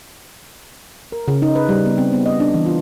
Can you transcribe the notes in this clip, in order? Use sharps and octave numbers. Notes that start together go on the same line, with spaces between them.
A#4
C#3
D#4
B4
G3
B3
C4
B3
D#5
D4
E3
F4